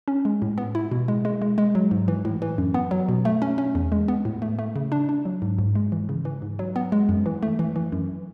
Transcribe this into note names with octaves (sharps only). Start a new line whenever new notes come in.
C#4
G#3
A2
B3
E4
B2
G#3
G#3
G#3
G#3
F#3
G#2
E3
A2
E3
F#2
B3
F#3
B2
A3
C#4
C#4
E2
G#3
B3
A2
A3
A3
C#3
D4
D4
F#3
G#2
G#2
G#3
E3
C#3
E3
G#2
F#3
B3
G#3
F#2
E3
A3
E3
E3
F#2